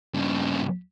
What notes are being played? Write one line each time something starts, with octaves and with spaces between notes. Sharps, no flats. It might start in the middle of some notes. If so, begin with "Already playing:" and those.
G2 C#3